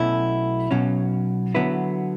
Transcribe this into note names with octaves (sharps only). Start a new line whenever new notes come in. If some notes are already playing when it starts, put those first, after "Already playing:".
Already playing: B1 B2 A3 C#4 E4
B1 B2 F#3 C#4
D3 F#3 B3 E4 B4